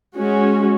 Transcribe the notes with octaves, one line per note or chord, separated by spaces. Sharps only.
G#3 C#4 F#4